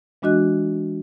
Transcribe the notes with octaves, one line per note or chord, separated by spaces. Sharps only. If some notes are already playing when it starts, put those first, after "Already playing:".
E3 G#3 D4 F#4 D#5 F#6